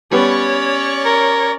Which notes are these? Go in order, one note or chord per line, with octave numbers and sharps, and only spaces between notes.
G3 B3 C#4 C#5 D5
A#4